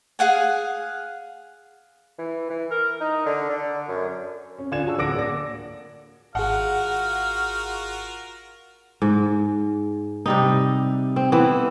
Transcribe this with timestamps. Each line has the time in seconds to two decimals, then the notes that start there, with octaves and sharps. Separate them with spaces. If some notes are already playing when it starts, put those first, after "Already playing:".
0.19 G#4 F5 F#5 G#5
2.18 E3
2.50 E3
2.71 A#4
3.01 D#4
3.26 D3
3.50 D3
3.88 F#2
4.58 C#4
4.72 D3 F4 D5 G#5 G#6 E7
4.84 F#4 G#4 C#5 A5 E6
4.98 D1 D3 F#5 D6 A#6 D7
5.14 A#3 D5 A#6
6.35 G#1 F4 F#4 G#4 A#4 F5 F#5
9.02 G#2
10.26 C3 G3 D#4
11.16 C4
11.32 E3 B3 C4